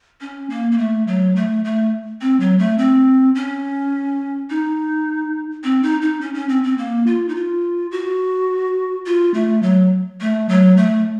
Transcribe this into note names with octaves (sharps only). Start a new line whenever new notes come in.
C#4
A#3
A#3
A3
F#3
A3
A3
C4
F#3
A3
C4
C#4
D#4
C4
D#4
D#4
C#4
C#4
C4
C4
A#3
F4
D#4
F4
F#4
F4
A3
F#3
A3
F#3
A3